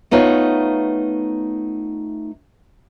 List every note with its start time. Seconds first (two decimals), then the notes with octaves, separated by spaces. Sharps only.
0.11 A3 B3 D#4 F4 C#5